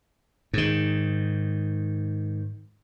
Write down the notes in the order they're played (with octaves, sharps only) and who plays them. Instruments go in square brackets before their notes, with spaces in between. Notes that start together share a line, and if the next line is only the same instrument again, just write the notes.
[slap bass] G#2 D#3